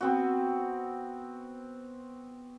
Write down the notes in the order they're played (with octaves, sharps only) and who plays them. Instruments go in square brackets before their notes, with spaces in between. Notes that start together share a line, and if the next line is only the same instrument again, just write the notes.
[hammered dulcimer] B3 C4 F#4